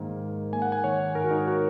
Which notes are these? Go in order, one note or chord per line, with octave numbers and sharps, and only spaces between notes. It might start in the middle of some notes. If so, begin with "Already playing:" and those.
Already playing: G#2 D#3 A#3
G#2
A#3 G#5
F#5
G#5
D#3 C#5
G#2 A#4
F#4
D#4
F#4